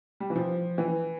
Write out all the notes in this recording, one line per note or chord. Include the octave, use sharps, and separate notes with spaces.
G3
E3
F3
E3